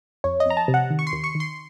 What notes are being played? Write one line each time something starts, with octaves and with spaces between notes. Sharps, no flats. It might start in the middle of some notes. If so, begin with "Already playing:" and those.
F2 C#5
D#5
F2 A#5
A5
C3
F#5
D#3
C#6
C6
D#2
C#6
D#3
C6